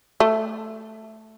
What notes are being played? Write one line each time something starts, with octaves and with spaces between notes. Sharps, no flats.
A3